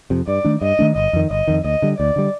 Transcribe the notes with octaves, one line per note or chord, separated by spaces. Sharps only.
F2 C3
G2 D5
D#3 A3 D4
G2 D#5
D#3 A3 D4
G1 D#5
F2 D#3
G1 D#5
F2 D#3
D2 D#5
D3 G3
D2 D5
D3 G3